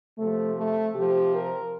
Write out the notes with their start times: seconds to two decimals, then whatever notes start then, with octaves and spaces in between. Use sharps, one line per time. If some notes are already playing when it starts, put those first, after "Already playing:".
0.17 C3 F3 A3
0.56 A3
0.94 C3 F3 G4
1.33 A#4